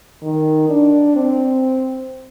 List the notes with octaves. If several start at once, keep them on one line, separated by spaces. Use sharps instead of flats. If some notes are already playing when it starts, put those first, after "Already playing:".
D#3
D4
C4